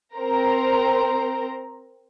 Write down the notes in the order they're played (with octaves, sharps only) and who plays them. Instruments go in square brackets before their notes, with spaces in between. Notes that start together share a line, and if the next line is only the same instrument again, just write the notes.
[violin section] C4 A#4 C5 A#5